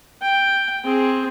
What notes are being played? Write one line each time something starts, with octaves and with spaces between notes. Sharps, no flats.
G5
C4 G#4